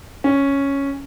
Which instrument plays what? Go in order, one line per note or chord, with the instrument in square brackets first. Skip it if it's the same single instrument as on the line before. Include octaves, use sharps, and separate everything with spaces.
[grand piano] C#4